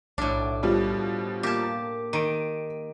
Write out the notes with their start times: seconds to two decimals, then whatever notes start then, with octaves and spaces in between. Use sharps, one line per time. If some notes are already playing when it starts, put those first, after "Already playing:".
0.18 B1 A2 D4
0.63 B2 F3 G3
1.43 A#3 G4 A5
2.13 D#3 D7 D#7